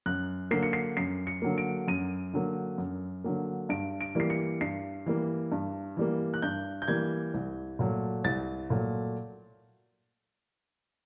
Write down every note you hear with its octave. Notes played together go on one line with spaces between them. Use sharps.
F#2 F#6
D3 F#3 A#3 C7
C#7
C7
F#2 C7
C#7
D3 F#3 A#3
D7
F#2 D#7
D3 F#3 A#3
F#2
D3 F#3 A#3
G2 D7
D7
E3 G3 A#3 C7
C#7
G2 C7
E3 G3 A#3
G2
E3 G3 A#3
F#6
G2 G6
G6
E3 G3 A#3 G#6
C2
A#2 F#3 A3
C2 A6
A#2 F#3 A3